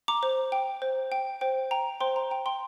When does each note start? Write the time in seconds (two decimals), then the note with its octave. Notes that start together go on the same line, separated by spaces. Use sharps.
0.08 A#5 D6
0.23 C5
0.52 G5
0.82 C5
1.12 G5
1.41 C5 G5
1.71 G5 A#5
2.00 C5 G5 C6
2.16 A#5
2.30 G5 A#5
2.46 G5 C6